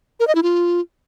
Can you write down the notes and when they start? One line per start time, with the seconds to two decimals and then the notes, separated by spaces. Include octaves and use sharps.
0.20 A#4
0.27 D#5
0.35 E4
0.43 F4